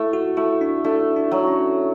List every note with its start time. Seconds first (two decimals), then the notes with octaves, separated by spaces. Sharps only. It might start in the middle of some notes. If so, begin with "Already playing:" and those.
Already playing: A3 E4
0.13 F#4
0.37 A3 E4
0.61 D4
0.85 A3 D4
1.16 D4
1.31 F#3
1.47 C#4